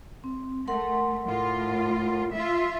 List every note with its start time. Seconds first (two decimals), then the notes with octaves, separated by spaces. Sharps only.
0.24 C4
0.68 A3 A#4 F#5 C6
1.25 A2 F4
2.34 F4 E5